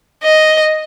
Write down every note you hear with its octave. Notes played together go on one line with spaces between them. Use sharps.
D#5